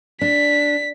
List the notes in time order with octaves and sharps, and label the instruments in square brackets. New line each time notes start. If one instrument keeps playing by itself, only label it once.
[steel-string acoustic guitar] D4 [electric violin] B6